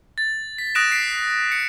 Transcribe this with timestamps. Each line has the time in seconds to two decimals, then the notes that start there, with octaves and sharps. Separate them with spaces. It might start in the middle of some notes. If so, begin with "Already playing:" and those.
0.18 A6
0.58 B6
0.75 D#6 F#6 A#6 D7 E7
0.91 B6 C7 D7
1.52 C#7